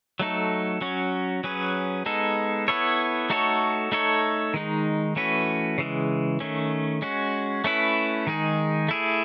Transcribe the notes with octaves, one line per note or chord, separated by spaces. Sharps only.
F#3 A3 D#4 A4
F#3 C#4 F#4 C#5
F#3 C#4 G#4 B4
G#3 B3 D#4 A4
B3 E4 A4 C#5
A3 D#4 F#4 A4 C#5
A3 D#4 A4 C#5
D#3 G#3 D#4
E3 A3 C#4 F#4 B4
C#3 E3 G#3
D#3 A3 C#4
G#3 C#4 F#4
A3 C#4 E4 B4
D#3 G#3 D#4 G#4
A3 E4 G#4